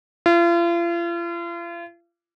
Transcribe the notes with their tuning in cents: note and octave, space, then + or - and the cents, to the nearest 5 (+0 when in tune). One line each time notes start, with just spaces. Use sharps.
F4 -40